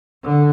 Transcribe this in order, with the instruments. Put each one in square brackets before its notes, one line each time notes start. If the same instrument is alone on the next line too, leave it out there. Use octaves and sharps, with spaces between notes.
[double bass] D3